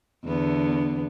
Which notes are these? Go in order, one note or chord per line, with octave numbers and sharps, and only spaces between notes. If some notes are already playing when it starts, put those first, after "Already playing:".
E2 D3 B3